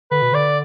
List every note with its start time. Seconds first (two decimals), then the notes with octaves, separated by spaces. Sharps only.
0.11 D3 B4
0.22 B2
0.32 D3 D5